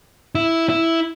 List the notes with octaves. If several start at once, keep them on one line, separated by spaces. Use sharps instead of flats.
E4
E4